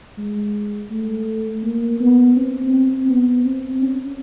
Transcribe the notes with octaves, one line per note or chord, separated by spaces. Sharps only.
G#3
A3
A#3
B3
C4
C4
B3
C4
C#4